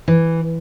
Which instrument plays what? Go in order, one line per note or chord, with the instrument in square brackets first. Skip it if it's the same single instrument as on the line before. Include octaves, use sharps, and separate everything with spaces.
[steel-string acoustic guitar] E3